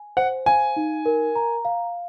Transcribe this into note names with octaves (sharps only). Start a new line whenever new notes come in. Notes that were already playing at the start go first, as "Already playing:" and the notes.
Already playing: G#5
C5 F#5
F5 G#5
D#4
A#4
A#5
F5